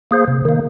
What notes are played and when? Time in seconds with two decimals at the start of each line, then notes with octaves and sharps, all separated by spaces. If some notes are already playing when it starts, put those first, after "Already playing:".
0.11 A#3 G#4 C5
0.28 C3
0.45 D#3 A#3